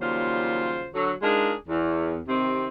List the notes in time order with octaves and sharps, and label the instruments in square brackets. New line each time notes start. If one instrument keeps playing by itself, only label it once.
[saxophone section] D#2 C#3 F#3 G3 F4 C5
D3 F#3
G#3 D4 D#4 F4 G#4 A#4
E2
C3 D#3 C4